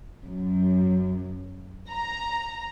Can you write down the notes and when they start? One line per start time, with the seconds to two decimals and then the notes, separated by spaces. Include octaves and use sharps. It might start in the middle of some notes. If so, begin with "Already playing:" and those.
0.24 F#2
1.89 A#5